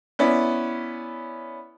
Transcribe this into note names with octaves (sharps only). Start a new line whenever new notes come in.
B3 C#4 E4 D5